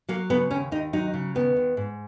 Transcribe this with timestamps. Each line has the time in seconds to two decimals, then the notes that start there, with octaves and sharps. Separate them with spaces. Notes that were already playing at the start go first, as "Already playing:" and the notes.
0.09 F#3 A#3
0.30 C#3 B3
0.51 D#2 C#4
0.72 D#2 D#4
0.93 F#3 D#4
1.14 C#3
1.35 D#2 B3
1.56 D#2
1.77 G#2